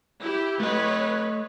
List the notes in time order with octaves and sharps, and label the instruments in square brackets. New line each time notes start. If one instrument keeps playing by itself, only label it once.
[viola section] E4 G4
[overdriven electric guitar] A3 D#5 [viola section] B4 C#5